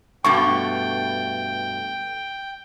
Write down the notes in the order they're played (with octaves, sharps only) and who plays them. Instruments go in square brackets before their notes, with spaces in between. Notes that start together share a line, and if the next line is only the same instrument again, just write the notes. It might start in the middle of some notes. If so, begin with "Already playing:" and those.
[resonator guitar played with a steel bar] G2 B2 A3 [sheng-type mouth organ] G5 [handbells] C#6